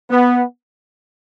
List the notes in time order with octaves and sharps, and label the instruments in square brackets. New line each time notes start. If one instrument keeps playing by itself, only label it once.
[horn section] B3